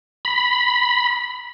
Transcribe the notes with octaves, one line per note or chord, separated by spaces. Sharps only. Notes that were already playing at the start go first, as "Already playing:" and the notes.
B5